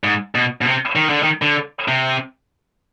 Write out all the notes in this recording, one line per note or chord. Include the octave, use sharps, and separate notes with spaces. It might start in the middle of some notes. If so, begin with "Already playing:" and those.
G#2
B2
B2
C3
D#3
D3
D#3
D3
C3